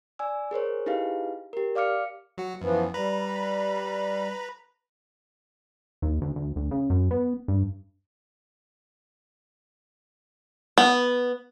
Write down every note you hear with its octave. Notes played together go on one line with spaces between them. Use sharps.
D5 G#5 E6
G#4 A#4 C5 C#5
D#4 E4 G4 G#4 B4 F5
G4 A#4
D5 F5 D6 F6 C#7
F#3 F#4
F#2 E3 F3 B3
G3 B4 A#5 B5
D#2
D2
D2
D2
C#3
F#2
B3
G2
B3